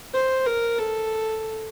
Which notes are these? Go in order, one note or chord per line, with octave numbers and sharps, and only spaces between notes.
C5
A#4
A4